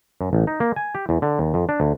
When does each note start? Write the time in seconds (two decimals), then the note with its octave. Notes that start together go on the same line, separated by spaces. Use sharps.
0.21 F#2
0.33 A1
0.47 D#4
0.60 A#3
0.76 G#5
0.95 G4
1.09 E2
1.22 D3
1.39 D#2
1.54 F2
1.69 D4
1.80 D2